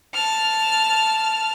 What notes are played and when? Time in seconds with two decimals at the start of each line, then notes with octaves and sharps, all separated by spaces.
0.15 A5 F6